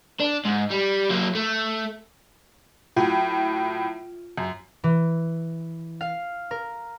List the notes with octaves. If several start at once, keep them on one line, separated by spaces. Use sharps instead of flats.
D4
G#2
G3
F#3 A#3
A3
A2 F#3 F4
F#2
E3
F5
A#4